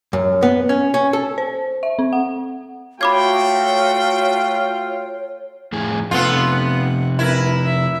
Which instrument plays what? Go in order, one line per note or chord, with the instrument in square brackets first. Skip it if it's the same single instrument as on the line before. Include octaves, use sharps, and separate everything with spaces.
[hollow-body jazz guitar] F#2
B3
C#4
C#4
A4
[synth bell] C5
E5
C4
F#5
[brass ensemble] A3 F#4 G5 [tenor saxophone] F4 [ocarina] C#5 [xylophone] B5 D6 G#6
[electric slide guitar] F2 A2 G#4
[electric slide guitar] F2 C3 [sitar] B3 F4 [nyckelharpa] A4 F#5
[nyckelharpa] F#5
[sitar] E4 [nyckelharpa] A#4 B4
[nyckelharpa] E5